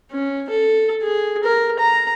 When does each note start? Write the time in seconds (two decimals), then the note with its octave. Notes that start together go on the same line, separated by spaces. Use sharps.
0.12 C#4
0.50 A4
1.02 G#4
1.44 A#4
1.79 A#5